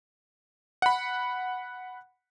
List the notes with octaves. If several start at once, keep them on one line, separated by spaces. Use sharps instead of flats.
F#5 B5